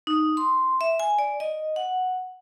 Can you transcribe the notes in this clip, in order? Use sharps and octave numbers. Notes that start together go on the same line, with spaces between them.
D#4
C6
E5
G#5
D5
D#5
F#5